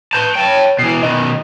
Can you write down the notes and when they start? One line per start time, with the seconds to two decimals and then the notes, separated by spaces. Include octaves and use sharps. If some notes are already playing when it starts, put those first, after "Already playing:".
0.13 B4 A5 G6
0.35 C#5 G5 A5
0.79 B2 E3 C7
1.03 B2 D#3 D#5